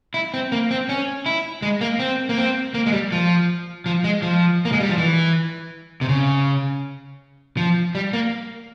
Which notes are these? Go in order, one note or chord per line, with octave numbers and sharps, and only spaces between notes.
E4
C4
A#3
C4
C#4
E4
G#3
A#3
C4
A#3
C4
A#3
G#3
G3
F3
F3
G#3
F3
A#3
G#3
G3
F3
E3
C3
C#3
F3
G3
A#3